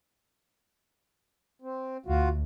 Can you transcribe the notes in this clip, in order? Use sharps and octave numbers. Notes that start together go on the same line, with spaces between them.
C4
D2 F4 F#4